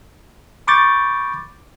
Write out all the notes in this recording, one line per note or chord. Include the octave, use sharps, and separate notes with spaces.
B5 C#6 D6 G6 A6